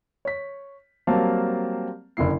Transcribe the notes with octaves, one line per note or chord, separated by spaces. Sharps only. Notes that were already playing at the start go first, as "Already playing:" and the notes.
C#5 B6
F#3 G3 A#3 C4 F5 A5
F#1 D3 E4 C7